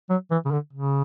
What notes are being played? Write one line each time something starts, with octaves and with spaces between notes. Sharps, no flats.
F#3
E3
C#3
D3
C#3